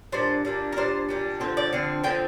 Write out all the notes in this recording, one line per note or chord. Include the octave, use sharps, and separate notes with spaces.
A#2 G3 D4 C5
A#2 G3 D4
A#4
A#2 G3 D4 C5
A#2 G3 D4
D3 F3 C4 C5
D5
D3 F3 C4
D3 F3 C4 G5